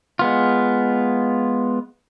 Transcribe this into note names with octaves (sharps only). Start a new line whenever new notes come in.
G#3 B3 F4